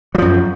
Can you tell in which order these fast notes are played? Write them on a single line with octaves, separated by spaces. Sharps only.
F#3 F3 F#2